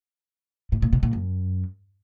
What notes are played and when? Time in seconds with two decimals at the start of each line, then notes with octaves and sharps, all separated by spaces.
0.72 A2
0.82 A#2
0.93 B2
1.03 A#2
1.13 F#2